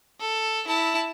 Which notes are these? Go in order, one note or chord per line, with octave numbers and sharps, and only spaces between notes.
A4
E4 A5